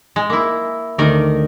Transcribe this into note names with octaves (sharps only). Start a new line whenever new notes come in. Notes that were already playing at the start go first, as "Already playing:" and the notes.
G#3
A#3 E4
D2 D#3 A#4 D5